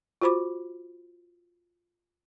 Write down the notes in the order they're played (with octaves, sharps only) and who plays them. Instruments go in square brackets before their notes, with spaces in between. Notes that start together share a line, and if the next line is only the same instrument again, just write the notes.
[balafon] F4 F#4 C5 B5 D6